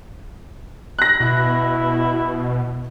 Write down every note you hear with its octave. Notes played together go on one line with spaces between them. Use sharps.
F#6 A#6
B2 E4